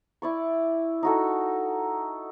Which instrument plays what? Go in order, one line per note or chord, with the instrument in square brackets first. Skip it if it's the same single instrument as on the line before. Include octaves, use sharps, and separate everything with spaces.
[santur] E4 D5 C#6
D#4 F#4 A4